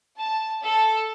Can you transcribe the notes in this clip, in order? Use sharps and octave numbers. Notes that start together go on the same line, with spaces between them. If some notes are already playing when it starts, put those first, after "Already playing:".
A5
A4